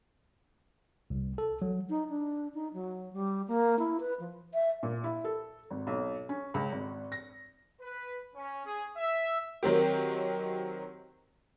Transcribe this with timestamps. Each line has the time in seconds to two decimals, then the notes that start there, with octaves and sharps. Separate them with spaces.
1.10 C2
1.38 A4
1.62 F#3
1.90 D#4
2.09 D4
2.54 D#4
2.73 F#3
3.13 G3
3.48 A#3
3.79 E4
4.00 B4
4.20 F3
4.54 E5
4.83 A#2
5.04 E4
5.24 A4
5.70 G#1
5.87 B1
6.29 C#4
6.54 C#2
6.72 G#1
7.12 A#6
7.81 B4
8.35 C#4
8.65 G#4
8.97 E5
9.63 D#3 F#3 C4 G4